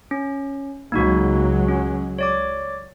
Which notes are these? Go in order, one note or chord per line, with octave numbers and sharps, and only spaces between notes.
C#4
C#2 F#3 G#3 A#3 D#4 F#4
C#4
C#5 D5 D6